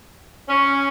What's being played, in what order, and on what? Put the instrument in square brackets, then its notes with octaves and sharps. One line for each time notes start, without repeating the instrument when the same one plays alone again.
[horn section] C#4